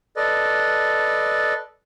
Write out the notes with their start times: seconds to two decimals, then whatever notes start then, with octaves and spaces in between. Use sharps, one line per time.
0.17 A4 B4 D5 D#5